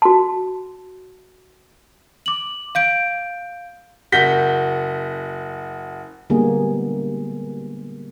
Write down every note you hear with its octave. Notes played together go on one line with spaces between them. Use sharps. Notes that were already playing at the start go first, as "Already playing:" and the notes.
F#4 A5
D6 F#7
F5 G6 D7
F#1 F#4 G6 A#6 B6 G7
D3 G3 G#3 A#3 B3 G#4